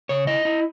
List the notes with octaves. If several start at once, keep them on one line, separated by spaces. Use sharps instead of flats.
C#3 C#5
E4 D#5
E4